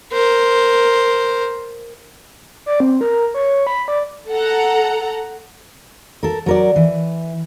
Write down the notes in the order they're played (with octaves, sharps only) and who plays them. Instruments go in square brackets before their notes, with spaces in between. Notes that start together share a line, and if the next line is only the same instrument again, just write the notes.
[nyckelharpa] A#4 C5
[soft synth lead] D5
C4
A#4
C#5
B5
D5
[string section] A4 F#5 A#5
[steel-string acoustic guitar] A4 A#4
F#3 A#4 D5
E3